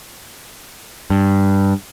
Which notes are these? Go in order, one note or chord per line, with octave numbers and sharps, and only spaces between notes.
G2